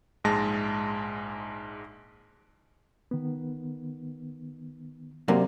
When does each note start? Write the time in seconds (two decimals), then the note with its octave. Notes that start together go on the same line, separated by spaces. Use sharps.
0.24 A#1 G#2 G#3 A5 A#6
3.11 D#3 B3
5.28 F#2 C3 A#3 D5